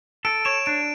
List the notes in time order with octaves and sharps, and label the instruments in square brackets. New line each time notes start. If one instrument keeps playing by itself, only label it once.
[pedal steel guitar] A4 [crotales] D7
[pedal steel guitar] C#5 [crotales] E7
[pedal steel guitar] D4 [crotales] D7